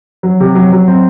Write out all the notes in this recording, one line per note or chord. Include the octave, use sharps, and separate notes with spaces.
F#3
C3
F#3
F#3
C4